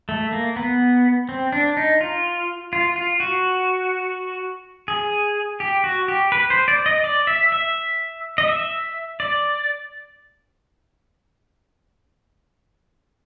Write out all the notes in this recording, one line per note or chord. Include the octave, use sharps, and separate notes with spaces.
A3
A#3
B3
C4
D4
D#4
F4
F4
F4
F#4
G#4
G4
F#4
G4
B4
C5
D5
D#5
D5
E5
E5
D#5
E5
D5